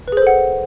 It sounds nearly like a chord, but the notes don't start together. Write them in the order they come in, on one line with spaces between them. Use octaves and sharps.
B4 G#4 C5 A4 F#5